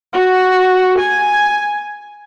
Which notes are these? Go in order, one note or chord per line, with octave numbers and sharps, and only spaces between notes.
F#4
G#5